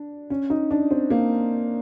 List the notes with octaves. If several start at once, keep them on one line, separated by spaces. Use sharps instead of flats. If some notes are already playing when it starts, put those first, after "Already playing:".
Already playing: D4
C#4
D#4
D4
C4
A#3